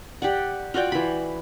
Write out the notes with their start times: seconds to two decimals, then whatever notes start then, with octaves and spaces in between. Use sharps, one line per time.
0.22 G4 D5 F#5
0.74 F4 F#4 D5 G5
0.92 E3 B5